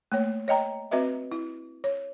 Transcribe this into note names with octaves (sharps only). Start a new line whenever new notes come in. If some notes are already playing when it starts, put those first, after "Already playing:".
A3 A#3 C#5
C#5 D#5 G5 A#5
C4 F#4 B4 D#5 E5
E4
C#5